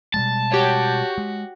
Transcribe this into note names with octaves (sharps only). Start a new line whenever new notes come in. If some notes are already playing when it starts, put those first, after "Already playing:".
B2 G3 G#3 A5
F#4 G4 C#5
G#3